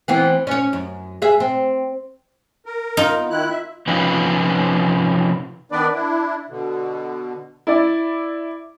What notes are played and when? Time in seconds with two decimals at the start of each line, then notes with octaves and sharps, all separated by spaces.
0.08 E3 B3 C4
0.47 C#4 C#5
0.73 F#2
1.22 G#4 E5
1.40 C4
2.66 A#4
2.97 D#4 F4
3.17 B3
3.30 D#3 E4 F#6
3.50 E5
3.87 C3 F3 C#4 D#4 F4 B4
5.72 D#3 B3 D4 B4 D5
5.94 D4 E4
6.49 B2 D3
7.67 E4 D5